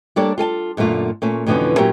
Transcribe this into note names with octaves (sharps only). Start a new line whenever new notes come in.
G3 A#3 D4 A4 C#5 D5
F4 A4 G#5 A5
F#2 A#2 D3 A3 F4
A#2 A3 C#4
F2 B2 D3 E3 B3 C#4
A#2 F#3 C#4 G4 A#4 E5